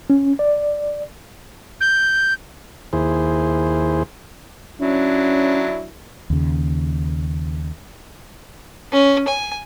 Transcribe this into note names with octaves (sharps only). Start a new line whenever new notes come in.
C#4
D5
G6
D#2 E4 G#4 C5
F#3 C#4 D4 E4
D#2 C#3
C#4
G#5